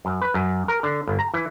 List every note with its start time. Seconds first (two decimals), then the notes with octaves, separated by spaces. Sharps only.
0.05 F#2
0.21 B4
0.34 F#2
0.68 A#4
0.83 D3
1.07 G1
1.19 A#5
1.34 E3